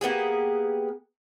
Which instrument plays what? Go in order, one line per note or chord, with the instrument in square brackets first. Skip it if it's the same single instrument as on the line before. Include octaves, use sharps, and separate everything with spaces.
[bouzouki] A#3 B3 G4 G#4